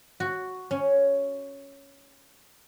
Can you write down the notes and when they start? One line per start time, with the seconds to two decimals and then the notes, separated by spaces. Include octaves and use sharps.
0.20 F#4
0.71 C#4